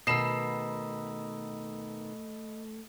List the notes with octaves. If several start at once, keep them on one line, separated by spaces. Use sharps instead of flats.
B2 D#3 A3 D#5 B5 E6 C7 E7